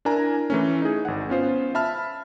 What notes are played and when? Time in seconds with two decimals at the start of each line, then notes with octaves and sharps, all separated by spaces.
0.05 D4 E4 A#4 G#5 A#5
0.50 E3 A3 C#4
0.82 D#4 G#4
1.05 G#1 F#5
1.29 B3 C#4 F4 C5
1.75 E5 A5 B5 F6